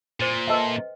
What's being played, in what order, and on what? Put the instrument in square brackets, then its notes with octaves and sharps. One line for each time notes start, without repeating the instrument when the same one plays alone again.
[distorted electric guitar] A#2 [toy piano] C5 C6
[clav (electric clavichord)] A4 E5 [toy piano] B4 D#5 G5